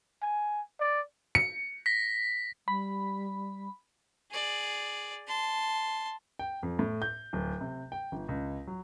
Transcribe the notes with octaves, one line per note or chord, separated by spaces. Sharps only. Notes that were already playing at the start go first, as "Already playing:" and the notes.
G#5
D5
C#7
A#6 B6
G3 B5
G#4 D5
A5 C6
G5
F2
A2
G6
D1
C3
G5
G1
C#2
F#3